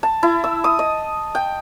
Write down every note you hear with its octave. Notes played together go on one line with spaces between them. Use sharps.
A5
E4
E6
D#6
D#5
G5